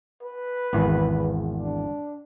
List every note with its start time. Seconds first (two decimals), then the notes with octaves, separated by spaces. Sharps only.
0.23 B4
0.73 G#1 E2
1.57 D4